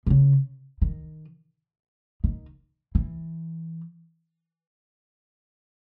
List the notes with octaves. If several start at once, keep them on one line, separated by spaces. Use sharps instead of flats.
B2
C#3
D#3
D#3
E3